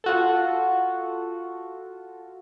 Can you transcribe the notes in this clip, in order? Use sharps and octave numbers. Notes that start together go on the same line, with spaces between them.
F4 F#4 A4